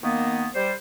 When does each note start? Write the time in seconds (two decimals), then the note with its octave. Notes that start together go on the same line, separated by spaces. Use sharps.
0.02 D#3 A#3 B3
0.55 G3 C5